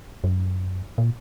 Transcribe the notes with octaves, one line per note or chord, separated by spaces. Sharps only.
F#2
A#2